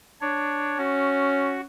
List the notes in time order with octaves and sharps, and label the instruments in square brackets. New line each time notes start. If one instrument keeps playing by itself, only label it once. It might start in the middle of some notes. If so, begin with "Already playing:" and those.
[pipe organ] D4 C#5
[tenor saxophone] C#4 [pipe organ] F#4